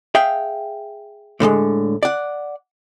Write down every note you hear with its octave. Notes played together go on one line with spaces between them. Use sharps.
G#4 E5 F5 G5
A2 D3 E3 G#3
D5 F#5